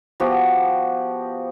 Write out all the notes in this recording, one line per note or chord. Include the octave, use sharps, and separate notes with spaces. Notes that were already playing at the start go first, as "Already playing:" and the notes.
F3 B3 F#4 G4